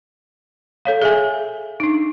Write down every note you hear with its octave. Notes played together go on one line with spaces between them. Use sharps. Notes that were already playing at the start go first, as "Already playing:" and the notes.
A4 C#5 F5
G#4 E5 G#5
D4 D#4